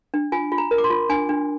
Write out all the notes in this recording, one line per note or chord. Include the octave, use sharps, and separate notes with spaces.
D4
F4 G#5
F4
A#5
A#4
D6
C6
F4
D4 G#5
D4